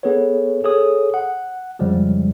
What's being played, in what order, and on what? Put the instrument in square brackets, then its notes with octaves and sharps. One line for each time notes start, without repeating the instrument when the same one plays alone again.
[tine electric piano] B3 G#4 A4 B4 C#5
G#4 A4 C#5 D#6
F#5
F2 C#3 F3 G3 G#3